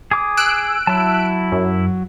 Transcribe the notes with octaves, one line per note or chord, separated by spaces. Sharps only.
G#4 D6 D#6
E6 F#6 D7
F#3 E4 A5
F#2